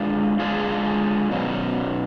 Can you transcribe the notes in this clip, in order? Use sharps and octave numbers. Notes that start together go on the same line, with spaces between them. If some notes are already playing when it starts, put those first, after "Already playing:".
Already playing: G#3 D4 F4 G#4
G#3 D4 F4 G#4
B2 F#3 C#4